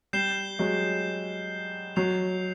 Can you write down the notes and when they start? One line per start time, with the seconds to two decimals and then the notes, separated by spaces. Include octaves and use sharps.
0.13 G3 G6 C7 E7 G7
0.59 F#3 G#3
1.96 F#3 G6 C7 F7